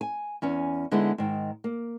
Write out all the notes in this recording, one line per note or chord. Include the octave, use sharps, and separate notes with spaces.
G#5
E2 C#4 G#5
D3 G#3 B3 D#4 E4
G#2 D#3
A#3